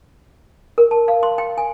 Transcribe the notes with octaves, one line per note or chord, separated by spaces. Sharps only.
A#4
A5
F5
C6
G5
G#5